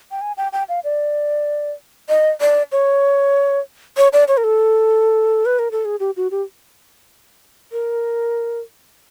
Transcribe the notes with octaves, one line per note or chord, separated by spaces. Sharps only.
G5
G#5
G5
G5
F5
D5
D#5
D5
C#5
C#5
D5
C#5
A#4
A4
B4
A#4
A4
G#4
G4
F#4
G4
A#4